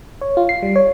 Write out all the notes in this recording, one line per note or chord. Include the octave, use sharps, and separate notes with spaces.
C#5
F4
C7
G3
C#5